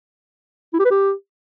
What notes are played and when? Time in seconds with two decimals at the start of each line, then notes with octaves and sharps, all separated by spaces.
0.74 E4
0.80 G4
0.85 B4
0.91 G4